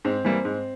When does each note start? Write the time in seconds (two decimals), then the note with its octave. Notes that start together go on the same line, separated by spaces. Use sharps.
0.05 G#2 C4
0.25 E3 G3 A#3
0.45 G#2